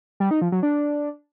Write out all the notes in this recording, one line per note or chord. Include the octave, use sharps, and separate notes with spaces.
G3
D#4
F3
F#3
D4